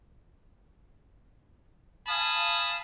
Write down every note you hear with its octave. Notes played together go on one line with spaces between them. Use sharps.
F5 G#5 A5 B5 D#6